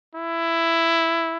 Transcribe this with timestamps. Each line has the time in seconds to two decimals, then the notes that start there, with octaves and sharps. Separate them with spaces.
0.15 E4